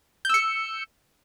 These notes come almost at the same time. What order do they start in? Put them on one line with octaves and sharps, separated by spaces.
G6 E6 C#7